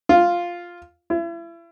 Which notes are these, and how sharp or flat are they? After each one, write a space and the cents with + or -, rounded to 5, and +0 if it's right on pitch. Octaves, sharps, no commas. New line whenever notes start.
F4 +0
E4 +35